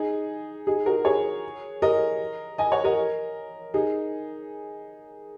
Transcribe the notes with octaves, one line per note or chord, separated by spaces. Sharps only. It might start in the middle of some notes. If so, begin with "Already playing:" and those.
Already playing: D#4 G#4
D#4 G#4
F#4 A#4
G#4 C#5
A#4 D#5
D#5 G#5
C#5 F#5
A#4 D#5
D#4 G#4